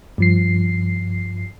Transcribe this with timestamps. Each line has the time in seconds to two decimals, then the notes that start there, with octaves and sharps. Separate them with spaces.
0.18 G2 F3 C7